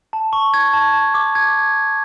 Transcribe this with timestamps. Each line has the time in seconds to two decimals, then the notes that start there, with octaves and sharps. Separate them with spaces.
0.13 A5
0.33 C#6
0.54 G#6
0.73 A5
0.93 A5
1.14 D6
1.35 G#6